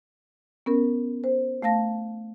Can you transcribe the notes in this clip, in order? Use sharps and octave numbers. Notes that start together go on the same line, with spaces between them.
B3 C#4 A#4
C5
A3 F5 A5 A#6